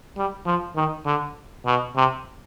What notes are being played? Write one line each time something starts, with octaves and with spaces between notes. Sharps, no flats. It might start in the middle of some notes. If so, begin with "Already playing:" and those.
G3
F3
D#3
D3
B2
C3